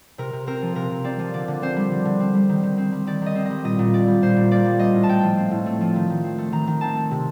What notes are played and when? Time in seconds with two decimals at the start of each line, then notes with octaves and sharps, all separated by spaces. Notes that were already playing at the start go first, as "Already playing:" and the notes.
0.18 C3 A#4
0.33 C3
0.47 C4 A#4
0.62 F3
0.75 C3 A#4
0.91 C3
1.04 C4 D5
1.19 F3
1.34 D3 D5
1.48 D3
1.62 C4 C5
1.77 G3
1.91 D3
2.05 D3
2.20 C4
2.34 G3
2.49 D#3
2.63 D#3
2.78 C4
2.92 G3
3.07 D#3 D5
3.22 D#3 D#5
3.35 C4
3.46 G3 D#5
3.64 A#2 D#5
3.79 A#2
3.94 A#3 D5
4.07 G3
4.22 A#2 C5
4.36 A#2
4.51 A#3 D5
4.65 G3
4.79 C4 D#5
4.94 A2
5.03 A5
5.09 A3 G5
5.23 F3
5.37 C4
5.51 A2
5.66 A3
5.81 F3
5.96 D#3
6.10 D#3
6.24 C4
6.38 A3
6.52 D#3 A#5
6.67 D#3
6.81 C4 A5
6.96 A3
7.11 C3